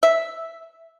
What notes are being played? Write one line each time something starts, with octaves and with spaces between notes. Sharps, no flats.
E5